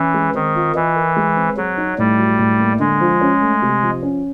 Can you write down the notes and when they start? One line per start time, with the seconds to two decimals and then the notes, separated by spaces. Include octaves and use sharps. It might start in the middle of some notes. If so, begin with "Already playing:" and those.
Already playing: E3 C#4
0.14 G#3
0.34 D#3 C4
0.55 F4
0.75 E3 D#5
0.96 A#4
1.16 G#3
1.37 C4
1.57 F#3 G#4
1.77 D#4
1.98 A2 G3
2.18 F#3
2.39 A2
2.60 A#3
2.79 D3 G#3
3.01 F3
3.21 C#4
3.41 A3
3.62 C3
3.83 F3
4.03 C#4